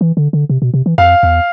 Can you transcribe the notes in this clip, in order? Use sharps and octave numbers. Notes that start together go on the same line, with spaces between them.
E3
D3
D3
C3
B2
C3
E3
F2 F5
E2